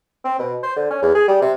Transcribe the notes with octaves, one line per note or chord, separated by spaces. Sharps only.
C4
B2
C5
D3
C#4
E2
G#4
G3
C3